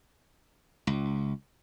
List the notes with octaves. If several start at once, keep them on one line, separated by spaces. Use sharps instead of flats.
C#2